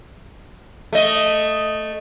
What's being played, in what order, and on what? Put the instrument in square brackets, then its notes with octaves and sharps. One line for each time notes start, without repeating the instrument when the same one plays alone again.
[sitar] A3 D#5